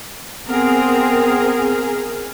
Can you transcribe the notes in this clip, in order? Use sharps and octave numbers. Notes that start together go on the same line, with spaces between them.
B3 C4 G#4 A#4